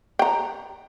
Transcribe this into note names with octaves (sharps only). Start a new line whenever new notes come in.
G5 A#5